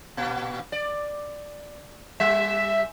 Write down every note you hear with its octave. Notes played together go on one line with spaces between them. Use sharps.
A#2 B3
D5
G3 E5